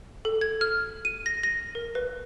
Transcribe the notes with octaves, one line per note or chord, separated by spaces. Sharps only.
A4
G#6
F6
D#7
A#6
A#6
A#4
B4